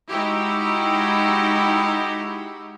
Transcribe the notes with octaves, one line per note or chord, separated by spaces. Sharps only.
G#3 D#4 E4 F#4 G4